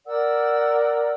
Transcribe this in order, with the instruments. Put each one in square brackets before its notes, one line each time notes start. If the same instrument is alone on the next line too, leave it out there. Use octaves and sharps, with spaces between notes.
[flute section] A#4 D5 F#5 E6